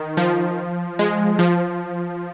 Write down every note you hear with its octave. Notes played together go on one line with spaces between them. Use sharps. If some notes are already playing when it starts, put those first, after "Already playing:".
Already playing: D#3
F3
G#3
F3